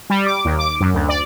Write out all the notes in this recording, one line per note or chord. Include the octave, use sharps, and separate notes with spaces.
G3
D6
D#2
D6
F#2
D2
D5